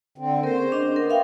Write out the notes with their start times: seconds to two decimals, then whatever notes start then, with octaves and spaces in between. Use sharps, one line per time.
0.18 D3 C4
0.43 A#3 C4 A#4 C5
0.56 C#4 G#4
0.72 D4 D#5
0.96 B3 A#4
1.10 E5 F5 G5